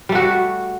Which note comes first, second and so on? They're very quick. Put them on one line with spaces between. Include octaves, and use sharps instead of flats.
G3 A3 F#4